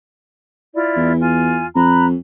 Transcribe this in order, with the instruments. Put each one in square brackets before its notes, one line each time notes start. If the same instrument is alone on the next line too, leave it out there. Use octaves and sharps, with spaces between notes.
[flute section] E4 F4 D5
[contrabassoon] E2
[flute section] F4 G#5
[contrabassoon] F2 [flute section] A#5 B5 F#6